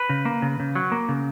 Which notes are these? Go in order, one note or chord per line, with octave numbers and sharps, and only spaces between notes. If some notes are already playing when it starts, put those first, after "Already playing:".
Already playing: B4
C#3
A#3
C#3
C#3
F#3
A#3
C#3